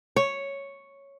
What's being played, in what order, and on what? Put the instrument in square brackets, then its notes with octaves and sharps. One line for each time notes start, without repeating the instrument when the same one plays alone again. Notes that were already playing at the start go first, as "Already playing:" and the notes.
[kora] C#5